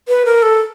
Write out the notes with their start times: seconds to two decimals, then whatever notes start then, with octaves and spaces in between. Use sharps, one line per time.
0.08 B4
0.25 A#4
0.42 A4